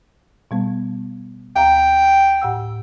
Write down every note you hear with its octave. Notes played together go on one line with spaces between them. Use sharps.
B2 G3 B3
D2 F5 G5 A#5
A2 F#5 E6